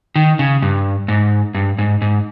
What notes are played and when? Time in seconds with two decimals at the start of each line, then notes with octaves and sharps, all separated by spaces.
0.16 D#3
0.39 C#3
0.62 G2
1.08 G#2
1.54 G2
1.78 G#2
2.02 G#2